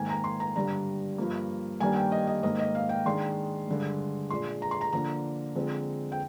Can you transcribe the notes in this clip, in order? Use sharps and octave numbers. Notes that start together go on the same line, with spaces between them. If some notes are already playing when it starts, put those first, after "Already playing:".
Already playing: G#2 D#3 A#3 G#5
A#5
C6
A#5
G2 D3 G3 D4 A#5
G2 F3 A#3
G2 D#3 G3 A#3 D4 G#5
G5
D#5
D#5
G#2 D#3 A#3 D#5
D#5
F5
G5
D#3 G#3 D4 C6
G2 D3 G#3
A#2 G#3 D4 C6
A#5
C6
A#5
D3 F3 A#3 D4 A#5
D3 F3 G#3 C4
G5